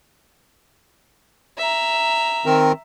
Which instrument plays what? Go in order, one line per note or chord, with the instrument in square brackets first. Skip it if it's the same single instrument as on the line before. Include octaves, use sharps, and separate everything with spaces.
[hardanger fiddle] E5 A#5
[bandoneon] D#3 C4 A#4